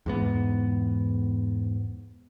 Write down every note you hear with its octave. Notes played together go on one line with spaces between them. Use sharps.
E2 G#2 B3